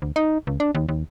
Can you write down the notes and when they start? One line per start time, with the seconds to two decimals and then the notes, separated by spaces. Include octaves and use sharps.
0.02 D2
0.16 D#4
0.47 C#2
0.60 D4
0.75 D#2
0.89 D#2